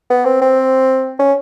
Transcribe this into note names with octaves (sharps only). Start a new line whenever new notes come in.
B3
C4
C4
C#4